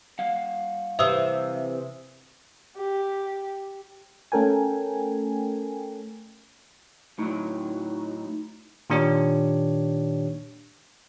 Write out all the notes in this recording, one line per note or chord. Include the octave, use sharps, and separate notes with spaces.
G3 F5 F#5
C3 E3 E5 D#6 E6
G4
A3 C#4 A4 A#4 G5 G#5
A2 F#3 D#4
A#2 D#3 D4 G4 C#5